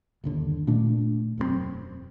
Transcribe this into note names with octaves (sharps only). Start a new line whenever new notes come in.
G1 D#2 D3
A#2 A3 D4
E1 F#2 G#3 C4